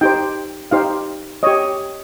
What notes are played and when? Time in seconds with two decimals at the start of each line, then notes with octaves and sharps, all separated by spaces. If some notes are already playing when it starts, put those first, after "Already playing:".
0.01 D#4 G4 C5 G5
0.71 D#4 G4 C5 F5
1.43 G4 C#5 D#5